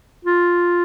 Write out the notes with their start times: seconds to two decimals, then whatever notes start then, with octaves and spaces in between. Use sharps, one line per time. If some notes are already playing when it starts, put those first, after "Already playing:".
0.25 F4